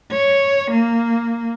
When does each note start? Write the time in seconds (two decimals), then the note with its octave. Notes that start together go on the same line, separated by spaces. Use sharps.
0.11 C#5
0.71 A#3